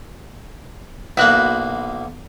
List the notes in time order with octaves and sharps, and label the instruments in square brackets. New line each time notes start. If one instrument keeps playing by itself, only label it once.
[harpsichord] B1 A#3 [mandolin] E4 F#4 F#6